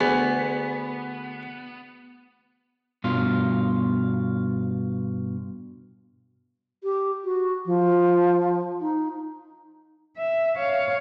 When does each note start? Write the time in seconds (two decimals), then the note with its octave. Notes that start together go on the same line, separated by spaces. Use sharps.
0.01 D2 B3 G#4
3.04 G2 B2 F4
6.84 G4
7.24 F#4
7.66 F3
8.81 D#4
10.17 E5
10.58 C#5 F5